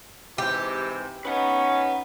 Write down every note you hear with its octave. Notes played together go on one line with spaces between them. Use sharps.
G#2 C3 E3 G4
C#4 D#4 B4 F#5